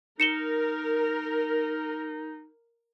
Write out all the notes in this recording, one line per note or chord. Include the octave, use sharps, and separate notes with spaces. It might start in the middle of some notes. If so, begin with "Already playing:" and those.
D#4 A#4 C#7 E7 G7